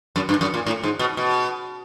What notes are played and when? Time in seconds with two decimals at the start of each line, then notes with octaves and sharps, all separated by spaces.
0.16 F#2
0.29 G2
0.41 F#2
0.54 A#2
0.67 A2
0.83 G#2
0.99 B2
1.17 B2